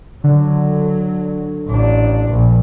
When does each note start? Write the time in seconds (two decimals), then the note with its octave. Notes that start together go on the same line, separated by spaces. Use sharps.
0.24 D3 F#3
1.68 A1 D4
2.30 A#1